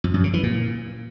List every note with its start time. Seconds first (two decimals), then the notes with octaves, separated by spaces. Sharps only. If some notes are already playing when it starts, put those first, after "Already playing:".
0.04 F2
0.14 F#2
0.24 C#3
0.34 E3
0.43 A#2